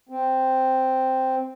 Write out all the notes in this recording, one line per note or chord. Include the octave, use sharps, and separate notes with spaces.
C4